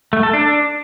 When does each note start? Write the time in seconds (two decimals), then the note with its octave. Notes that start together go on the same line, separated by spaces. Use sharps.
0.13 A3
0.23 A4
0.34 D4